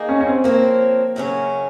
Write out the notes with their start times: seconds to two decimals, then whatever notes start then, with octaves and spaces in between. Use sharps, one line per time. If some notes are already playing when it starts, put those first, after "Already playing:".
Already playing: D#3 A#3 D#4 G#4
0.09 C#4
0.20 C#4
0.27 C4
0.44 F3 A#3 C4 F#4 A#4 C#5
1.16 F#2 C#3 F#3 C#4